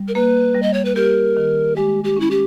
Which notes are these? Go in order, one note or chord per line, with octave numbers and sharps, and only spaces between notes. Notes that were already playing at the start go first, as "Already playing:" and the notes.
Already playing: G3
A#4
A#3 B4
G3
D#5
C#5
B4
G4 A#4
D#3
G#3 G4
G4
C#4 E4
G4